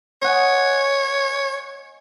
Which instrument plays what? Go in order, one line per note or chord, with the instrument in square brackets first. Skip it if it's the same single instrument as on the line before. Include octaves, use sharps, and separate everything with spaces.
[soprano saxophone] C#5 [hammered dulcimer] D#5 F#5 G#5